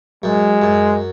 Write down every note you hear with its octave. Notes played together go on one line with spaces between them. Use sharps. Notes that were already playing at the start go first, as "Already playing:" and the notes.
F#2 G#3
F#2